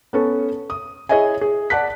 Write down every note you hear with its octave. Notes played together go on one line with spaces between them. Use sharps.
B3 C#4 A4
D#6
E4 G#4 C#5 D#5 E5 G#5
G#4
D5 F#5 A5 F#6 B6